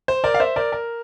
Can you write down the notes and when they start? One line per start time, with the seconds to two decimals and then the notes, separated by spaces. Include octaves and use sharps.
0.08 C5
0.24 A#4 D5
0.34 F5
0.40 C5 E5
0.56 A#4 D5
0.72 A#4